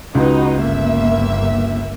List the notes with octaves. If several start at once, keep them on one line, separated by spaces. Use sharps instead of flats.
C#2 D#4 F#4 B4
G1 A#3 E5